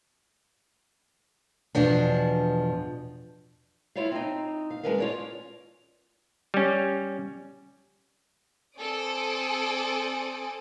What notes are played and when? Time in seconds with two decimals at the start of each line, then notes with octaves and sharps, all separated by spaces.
1.75 E2 B2 F3 D4
3.95 E4 F4 C#5 E5 F5
4.12 C4 D#4
4.70 F5
4.83 G#3 C4 C#4 A#4 B4 F5
4.98 F4 C#5 D5
6.54 G3 C#4
8.79 C4 A4 D5 G#5 D#6 D7